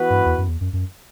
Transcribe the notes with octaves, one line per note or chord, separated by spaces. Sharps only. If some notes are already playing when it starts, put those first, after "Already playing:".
Already playing: E3 B3 F#4 B4
G2
E2
F#2
E2
F#2
F#2